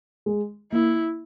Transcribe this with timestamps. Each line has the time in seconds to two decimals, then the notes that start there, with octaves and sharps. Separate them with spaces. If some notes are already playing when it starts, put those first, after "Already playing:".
0.26 G#3
0.72 A#3 E4